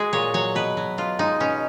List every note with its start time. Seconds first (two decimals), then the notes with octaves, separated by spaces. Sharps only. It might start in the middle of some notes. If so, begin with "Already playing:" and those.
Already playing: G#3 F#4 G#4
0.13 A#2 C#5
0.34 F#3 C#5
0.55 B2 B4
0.77 F#3
0.98 B2 F4
1.19 G#3 D#4
1.40 B2 C#4